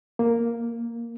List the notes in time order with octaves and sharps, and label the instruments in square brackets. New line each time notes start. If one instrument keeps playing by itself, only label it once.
[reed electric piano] A#3